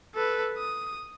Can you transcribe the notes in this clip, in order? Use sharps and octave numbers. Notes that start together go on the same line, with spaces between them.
A4 B4
D#6